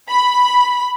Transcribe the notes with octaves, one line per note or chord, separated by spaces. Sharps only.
B5